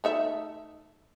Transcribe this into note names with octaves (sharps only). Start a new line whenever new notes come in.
A3 D#4 E5